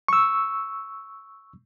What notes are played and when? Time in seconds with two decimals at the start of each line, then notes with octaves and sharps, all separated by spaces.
0.08 C#6 E6